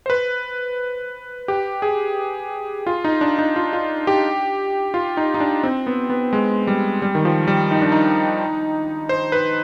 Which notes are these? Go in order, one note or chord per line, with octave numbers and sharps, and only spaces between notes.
C5
B4
G4
G#4
F4
D#4
D4
D#4
F4
F4
G4
F4
D#4
D#4
D4
C4
B3
B3
G#3
G3
G3
D#3
F3
G3
D#4
D4
D#4
C5
B4